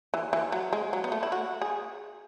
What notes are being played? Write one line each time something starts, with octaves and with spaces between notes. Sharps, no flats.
E3
E3
F#3
G#3
F#3
B3
A3
E4
F#4
G#4